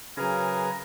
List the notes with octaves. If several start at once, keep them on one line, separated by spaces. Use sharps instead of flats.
C#3 F#3 G#4 A#4 B4 F5 G#5 A#5